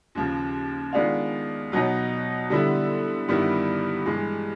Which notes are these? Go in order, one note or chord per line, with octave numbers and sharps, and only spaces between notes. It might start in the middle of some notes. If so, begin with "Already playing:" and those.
D#2 C#3 F3
D#3 G#3 B3 D4 F4
B2 F#3 B3 D#4
D3 G3 B3 E4
G2 D#3 G3 B3 E4
G2 E3 G#3